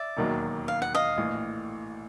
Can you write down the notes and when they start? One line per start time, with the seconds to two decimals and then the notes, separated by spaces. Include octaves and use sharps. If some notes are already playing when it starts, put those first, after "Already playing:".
Already playing: D5 E5
0.17 E1 D#2 D#3 F#3
0.68 F5
0.82 F#5
0.95 D#5 F5
1.17 A#1 A2 E3